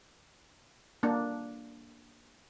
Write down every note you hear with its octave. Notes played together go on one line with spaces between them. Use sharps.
A#3 D4